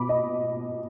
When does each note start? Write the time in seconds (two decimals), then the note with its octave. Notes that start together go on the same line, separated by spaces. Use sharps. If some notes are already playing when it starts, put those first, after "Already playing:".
Already playing: B2 B5 D6
0.09 D#5